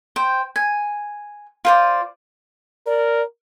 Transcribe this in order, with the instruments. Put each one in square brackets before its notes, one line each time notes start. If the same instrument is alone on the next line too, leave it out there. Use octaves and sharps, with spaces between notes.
[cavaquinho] C5 G5
G#5
F4 C5 D5
[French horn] A#4 [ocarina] D5